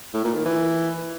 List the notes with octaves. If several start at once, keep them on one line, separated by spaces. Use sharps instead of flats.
A2
A#2
D#3
E3